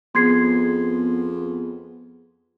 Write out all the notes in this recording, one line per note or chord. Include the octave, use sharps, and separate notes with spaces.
F2 B3 G#4 C6 G#6 C7